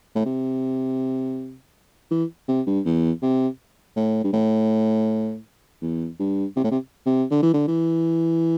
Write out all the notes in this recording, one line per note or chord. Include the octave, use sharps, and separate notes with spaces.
A2
C3
E3
C3
G2
E2
C3
A2
G2
A2
E2
G2
C3
A2
C3
C3
D3
E3
D3
E3